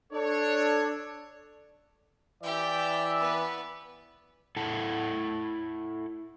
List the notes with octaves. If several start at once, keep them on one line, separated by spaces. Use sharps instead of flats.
D4 A4 C#5
E3 G4 D5 E5 G5
B3 B4
E4 A4 F#5 A5